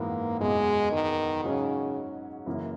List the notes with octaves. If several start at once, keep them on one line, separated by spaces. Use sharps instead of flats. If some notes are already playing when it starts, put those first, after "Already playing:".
Already playing: G#1 F#2 E3 G#3 A#3 B3
F#1 E2 B2 G#3
D#3
G#2 C#3 F#3 C#4 F#4
F#2 C#3 E3 A#3